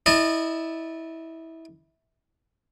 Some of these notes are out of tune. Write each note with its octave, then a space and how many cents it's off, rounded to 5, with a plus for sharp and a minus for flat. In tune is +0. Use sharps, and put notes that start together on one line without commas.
E4 -20 D#5 -35 A5 +0